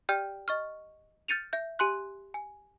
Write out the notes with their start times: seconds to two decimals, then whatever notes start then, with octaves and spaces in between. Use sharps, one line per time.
0.09 G4 D5 G5 F6 G6
0.48 D#5 C#6 F6
1.28 F6 G6 A6 C#7 D#7 F7
1.53 E5 G6
1.79 G4 G#5 C6 F#6
2.34 G#5